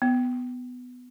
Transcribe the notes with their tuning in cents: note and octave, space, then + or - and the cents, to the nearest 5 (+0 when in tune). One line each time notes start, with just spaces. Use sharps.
B3 +10